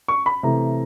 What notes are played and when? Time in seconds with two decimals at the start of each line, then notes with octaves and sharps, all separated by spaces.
0.08 C#6
0.26 B5
0.43 C3 E3 A3 A#5